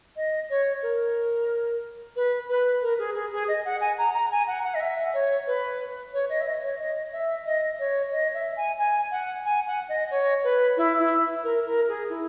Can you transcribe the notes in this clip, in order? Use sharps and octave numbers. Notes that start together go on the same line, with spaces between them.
D#5
C#5
A#4
B4
B4
A#4
G#4
G#4
G#4
D#5
F#5
G#5
A#5
A#5
G#5
F#5
F#5
D#5
E5
C#5
B4
C#5
D#5
E5
D#5
C#5
D#5
E5
D#5
C#5
D#5
E5
G#5
G#5
F#5
G#5
F#5
D#5
C#5
B4
E4
E4
A#4
A#4
G#4
E4